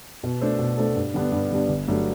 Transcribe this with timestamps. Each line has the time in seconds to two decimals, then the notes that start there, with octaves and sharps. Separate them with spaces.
0.23 B2
0.41 A3 D4 A4 C5
0.59 B2
0.78 A3 D4 A4 C5
0.96 G2
1.14 D3 G3 B3 D4
1.32 G2
1.51 D3 G3 B3 D4
1.69 G1
1.88 G2 F#3 A3